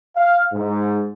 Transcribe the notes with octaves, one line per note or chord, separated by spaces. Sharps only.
F5
G#2